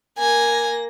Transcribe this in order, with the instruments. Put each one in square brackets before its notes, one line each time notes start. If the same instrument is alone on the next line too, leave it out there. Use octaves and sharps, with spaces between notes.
[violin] A#3 A#6 [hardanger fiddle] G#5